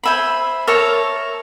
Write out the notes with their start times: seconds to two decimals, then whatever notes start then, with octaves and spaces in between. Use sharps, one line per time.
0.03 C5 E5 G#5 B5
0.67 A#4 C#5 E5 A5